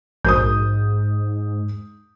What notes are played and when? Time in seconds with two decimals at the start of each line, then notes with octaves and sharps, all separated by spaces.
0.24 A#1 G#2 B2 D#6 G6